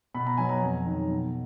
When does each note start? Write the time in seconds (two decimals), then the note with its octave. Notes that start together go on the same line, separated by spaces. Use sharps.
0.15 B2 B5
0.27 A#5
0.37 F#3 B3 G#5
0.49 A#5
0.62 F2
0.86 D#3 F#3
1.09 B2